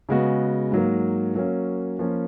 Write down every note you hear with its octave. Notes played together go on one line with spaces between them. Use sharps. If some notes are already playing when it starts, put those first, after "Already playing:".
C#3 G#3 B3 F#4
G#2 F#3 A#3
F#3 A#3 C#4
F3 A#3 C#4